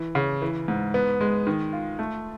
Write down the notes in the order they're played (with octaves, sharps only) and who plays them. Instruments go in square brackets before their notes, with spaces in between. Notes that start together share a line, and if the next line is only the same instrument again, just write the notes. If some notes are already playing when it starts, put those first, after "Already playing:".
Already playing: [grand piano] E3
C#3
E3
G#2
B3
G#3
D#3
F4
A3